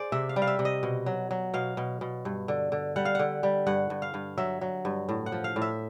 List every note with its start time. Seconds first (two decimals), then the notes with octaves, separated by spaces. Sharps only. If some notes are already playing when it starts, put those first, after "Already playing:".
Already playing: G#4 C5 D5
0.12 C3 E5
0.29 F5
0.36 G3
0.42 F5
0.47 E5
0.59 C3
0.65 D#5
0.83 B2
1.06 F#3
1.31 F#3
1.54 B2 F5
1.77 B2
2.01 B2
2.25 G2
2.48 D3
2.72 D3
2.96 G3 F#5
3.05 F5
3.15 D3 F#5
3.43 G3
3.67 G2 F#5
3.90 G2
4.02 F5
4.14 G2
4.38 F#3 E5
4.61 F#3
4.85 G2
5.09 A2
5.26 F#5
5.32 F3
5.44 F5
5.56 A2
5.62 E5